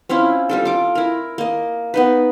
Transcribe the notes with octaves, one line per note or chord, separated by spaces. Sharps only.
C4 C#4 E4 F4
G3 F4 A4
F4 D6
E4 A#4
A#3 D#5
B3 D#4 B4